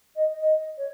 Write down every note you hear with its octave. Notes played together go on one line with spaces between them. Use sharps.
D#5
D#5
C#5